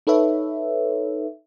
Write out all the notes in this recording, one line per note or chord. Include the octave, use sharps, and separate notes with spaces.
D#4 A4 B4 C#5 E5